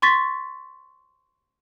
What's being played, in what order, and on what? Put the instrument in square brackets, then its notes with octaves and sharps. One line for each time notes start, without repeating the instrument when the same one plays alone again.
[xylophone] C6 C#6 A6 B6